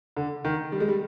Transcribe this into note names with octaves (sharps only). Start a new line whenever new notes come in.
D3
D#3
G3
G#3
G3